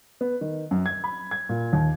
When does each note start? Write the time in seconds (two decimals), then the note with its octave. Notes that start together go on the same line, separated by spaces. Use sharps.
0.21 B3
0.41 D#3
0.71 F#2
0.86 G#6
1.04 B5
1.31 G#6
1.49 A#2
1.73 D#2